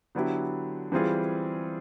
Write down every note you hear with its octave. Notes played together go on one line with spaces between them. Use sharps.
D3 F#3 B3 E4 G4
E3 G3 C4 F4 G#4